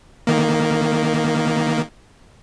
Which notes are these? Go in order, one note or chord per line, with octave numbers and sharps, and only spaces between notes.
D#3 A#3